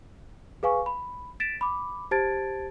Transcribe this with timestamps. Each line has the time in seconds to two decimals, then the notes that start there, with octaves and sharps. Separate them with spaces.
0.63 G#4 B4 F5 G#5 C#6
0.86 B5
1.40 A6 B6 D7 E7
1.61 B5 D6
2.11 G4 C5 A5 G#6 A6 D7